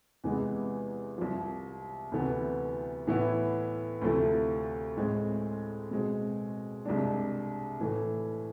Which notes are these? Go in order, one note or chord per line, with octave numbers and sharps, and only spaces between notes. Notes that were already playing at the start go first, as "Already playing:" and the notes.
E2 C3 E3 G#3 B3
C2 C3 F3
D2 C3 E3 B3
A2 E3 B3 E4
D2 C3 F3 A3 E4
A2 G#3 C4
B2 G#3 C4
C2 C3 G#3 D4
A2 E3 A3